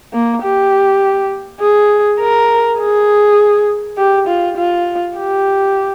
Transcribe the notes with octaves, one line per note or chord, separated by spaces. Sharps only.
A#3
G4
G#4
A#4
G#4
G4
F4
F4
G4